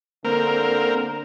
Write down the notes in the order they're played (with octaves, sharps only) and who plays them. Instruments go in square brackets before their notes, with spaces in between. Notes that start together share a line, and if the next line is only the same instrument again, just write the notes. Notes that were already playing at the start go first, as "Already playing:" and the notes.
[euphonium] D3 [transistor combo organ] A#3 C4 A#4